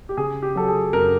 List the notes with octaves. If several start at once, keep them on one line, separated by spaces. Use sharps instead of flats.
G4
C#3 G#4
G4
F#3 A4
G#4
F#2 A#4